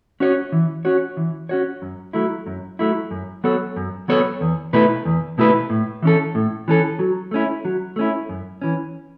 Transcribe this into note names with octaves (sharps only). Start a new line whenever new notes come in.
C#4 F#4 C#5
E3
C#4 F#4 C#5
E3
C#4 F#4 C#5
F#2
F#3 A3 E4
F#2
F#3 A3 E4
F#2
F#3 B3 A4 C#5
F#2
F#3 B3 A4 C#5
E2
B2 A3 E4 B4
E2
B2 A3 E4 B4
A2
E3 C#4 A4
A2
E3 C#4 A4
F#3
A3 C#4 E4
F#3
A3 C#4 E4
F#2
E3 C#4